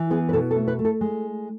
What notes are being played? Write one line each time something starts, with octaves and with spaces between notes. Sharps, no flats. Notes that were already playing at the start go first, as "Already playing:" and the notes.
Already playing: E3
B3 G#4
B4
B2 A4
A4
A3
B4
A3
A4
G#3